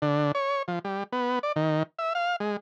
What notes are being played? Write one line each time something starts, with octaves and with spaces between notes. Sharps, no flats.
D3
C#5
F3
G3
B3
D5
D#3
E5
F5
G#3